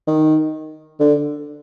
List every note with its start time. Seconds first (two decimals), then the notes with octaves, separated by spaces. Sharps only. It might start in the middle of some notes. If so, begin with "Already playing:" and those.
0.07 D#3
1.00 D3